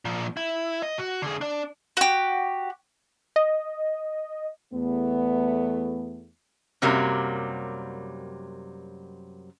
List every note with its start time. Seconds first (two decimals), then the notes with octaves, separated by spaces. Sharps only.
0.05 A#2 F3
0.37 E4
0.82 D#5
0.98 F#4
1.22 D3 G#4
1.41 D4 D5
1.97 F#4 G4
3.36 D#5
4.73 E2 A3 B3
6.82 F#2 C3 F#3 G3 A#3